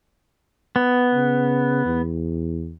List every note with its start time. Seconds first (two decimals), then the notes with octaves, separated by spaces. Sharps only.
0.76 B3
1.14 C#3
1.85 E2